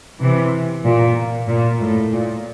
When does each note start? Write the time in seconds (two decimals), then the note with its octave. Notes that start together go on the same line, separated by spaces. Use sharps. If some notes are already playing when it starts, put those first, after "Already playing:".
0.20 C3 E3
0.85 A#2
1.48 A#2
1.80 A2
2.12 A#2